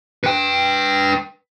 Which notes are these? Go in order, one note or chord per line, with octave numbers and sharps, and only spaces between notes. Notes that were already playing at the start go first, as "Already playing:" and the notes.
B4 G5